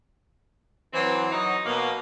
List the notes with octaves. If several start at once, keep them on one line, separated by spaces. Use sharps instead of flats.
E3 F#3 C4
F#3 D#4
B2 A#3